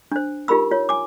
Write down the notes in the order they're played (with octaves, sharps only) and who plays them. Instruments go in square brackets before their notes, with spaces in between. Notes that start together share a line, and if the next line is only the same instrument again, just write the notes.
[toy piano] D4 C5
D#4 F4 G4 A#4 B5 E6
F4 C#5
G#5 D6